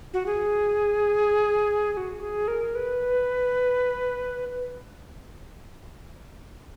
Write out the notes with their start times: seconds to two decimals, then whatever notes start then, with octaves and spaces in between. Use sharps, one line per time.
0.14 F#4
0.26 G#4
1.92 G#4
1.97 F#4
2.20 G#4
2.48 A#4
2.75 B4